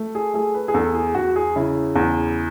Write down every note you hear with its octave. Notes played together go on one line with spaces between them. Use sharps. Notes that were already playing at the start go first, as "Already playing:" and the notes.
Already playing: A3
G#4
A3 G#4
B4
G#4
E2 A4
G#4
E2 F#4
G#4
C#3 E4
E2